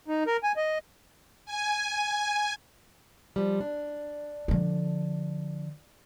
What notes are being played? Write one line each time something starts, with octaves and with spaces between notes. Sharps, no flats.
D#4
A#4
G#5
D#5
G#5
F3 G3
D4
D3 F3